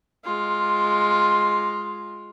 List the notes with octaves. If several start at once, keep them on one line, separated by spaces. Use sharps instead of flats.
G#3 F4